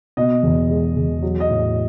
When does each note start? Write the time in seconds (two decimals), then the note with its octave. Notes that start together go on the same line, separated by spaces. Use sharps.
0.17 B2 D#5
0.43 E2
0.70 G#3
0.97 E2
1.22 F#3
1.40 D#5
1.50 A2